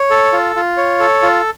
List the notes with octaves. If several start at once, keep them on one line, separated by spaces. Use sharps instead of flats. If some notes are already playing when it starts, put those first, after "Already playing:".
Already playing: C#5
A4
F4
F4
C#5
A4
F4